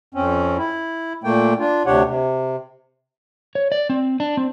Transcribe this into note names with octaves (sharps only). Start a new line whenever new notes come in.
F2 C4 C#4
E4
A#2 A3 A#3 G5
D4 F4
D2 C3 D4 G4 C#5 F#5
C3
C#5
D5
C4
D4
C4